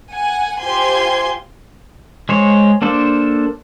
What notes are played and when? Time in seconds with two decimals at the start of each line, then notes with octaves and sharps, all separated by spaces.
0.12 F#5 G#5
0.60 F4 G4 C5 G#5 C6 G#6
2.29 G#3 C5 C#5
2.82 A#3 D4 A4 C5